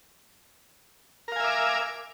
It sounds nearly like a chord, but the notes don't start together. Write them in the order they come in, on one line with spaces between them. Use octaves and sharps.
A#4 F5 G#5 E5 D6